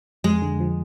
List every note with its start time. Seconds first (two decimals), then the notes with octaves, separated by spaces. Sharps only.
0.24 F2 G#3
0.42 D3
0.60 F3